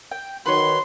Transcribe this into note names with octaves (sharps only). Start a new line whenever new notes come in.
G5
D#3 F#3 B4 C#5 C6